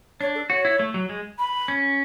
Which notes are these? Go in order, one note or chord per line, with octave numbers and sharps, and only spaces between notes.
D4 C#5
A4
F#4 C#5
E4
A3
F#3
G#3
B5
C#4